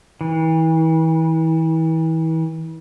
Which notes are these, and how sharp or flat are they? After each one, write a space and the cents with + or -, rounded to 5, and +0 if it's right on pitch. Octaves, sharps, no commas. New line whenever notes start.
E3 -35